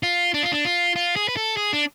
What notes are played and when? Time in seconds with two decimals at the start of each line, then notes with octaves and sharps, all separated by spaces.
0.03 F4
0.34 D4
0.43 F4
0.52 D4
0.65 F4
0.96 F4
1.16 G#4
1.28 B4
1.37 A4
1.57 G#4
1.73 D4